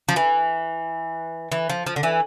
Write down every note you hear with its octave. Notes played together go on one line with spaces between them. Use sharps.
F3
E3
E3
F3
F3
D3
E3